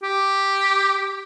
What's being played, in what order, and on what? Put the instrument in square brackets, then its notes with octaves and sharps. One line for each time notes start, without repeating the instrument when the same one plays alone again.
[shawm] G4